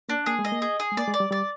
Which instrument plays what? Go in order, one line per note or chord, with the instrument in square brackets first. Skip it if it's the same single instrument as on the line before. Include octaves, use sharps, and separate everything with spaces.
[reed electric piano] A#3 [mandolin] D4
[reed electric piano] A#3 [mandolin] G#4
[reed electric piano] G#3
[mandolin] D#5
[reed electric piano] A#3
[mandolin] G#4
G#4
[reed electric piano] G#3
[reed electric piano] A#3 [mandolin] D5
[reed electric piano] G#3
[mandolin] D5
[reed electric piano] G3
[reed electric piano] G3 [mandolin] D5